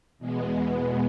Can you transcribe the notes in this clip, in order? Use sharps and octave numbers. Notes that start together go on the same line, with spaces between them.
E2 B2 G#3 B3